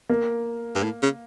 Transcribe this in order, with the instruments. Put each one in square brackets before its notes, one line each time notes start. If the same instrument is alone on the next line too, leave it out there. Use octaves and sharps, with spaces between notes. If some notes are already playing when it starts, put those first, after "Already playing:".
[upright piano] A#3
[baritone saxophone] G2
A2
C#3